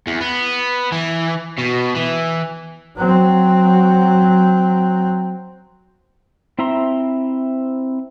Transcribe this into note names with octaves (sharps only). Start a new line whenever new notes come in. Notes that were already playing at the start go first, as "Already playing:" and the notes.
E2
B3
E3
B2
E3
F#3 C4
C4 E4 E5 A#5 C6